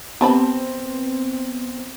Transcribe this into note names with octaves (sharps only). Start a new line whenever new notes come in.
B3 C4 G4 A5 B5